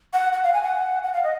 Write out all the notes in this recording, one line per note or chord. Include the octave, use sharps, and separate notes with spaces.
F#5
F#5
F5
G#5
F#5
F#5
F5
D#5